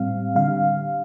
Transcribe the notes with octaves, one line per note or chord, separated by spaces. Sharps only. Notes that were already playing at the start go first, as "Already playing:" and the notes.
Already playing: A2 G3 C4 F5
D3 G3 F5